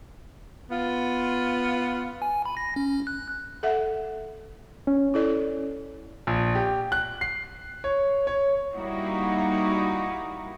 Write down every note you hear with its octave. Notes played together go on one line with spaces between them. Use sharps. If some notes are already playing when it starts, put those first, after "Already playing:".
B3 F4
G#5
B5
A#6
C#4
F#6
A4 E5 F#5
C#4
E4 A4 D5
A#1
G4
F#6
C7
C#5
C#5
G3 A#3 D#4 E4 F#4